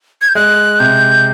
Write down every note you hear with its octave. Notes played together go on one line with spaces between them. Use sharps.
G#6
G6
G#3 F#6
C3 G6